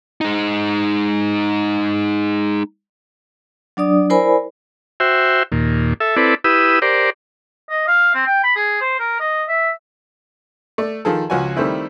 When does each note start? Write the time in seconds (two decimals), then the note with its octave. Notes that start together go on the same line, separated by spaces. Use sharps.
0.21 G#3 D#4
3.77 F#3 D4 D5 D#6
4.10 E4 A#4 C5 D5 G#5 B5
5.00 F#4 C5 E5 G5
5.52 D#2 A#2
6.00 A4 E5
6.16 C4 E4 A4 B4 D5
6.44 E4 G4 B4 D#6 E6
6.82 G4 A#4 C5 D5
7.70 D#5
7.87 F5
8.14 C4
8.27 G5
8.44 B5
8.56 G#4
8.81 C5
8.99 A#4
9.20 D#5
9.49 E5
10.78 A3 D5
11.05 D#3 F3 G#4 A4
11.30 C#2 F3 F#4 C#5 G#5
11.56 D#3 G3 A3 C4 E4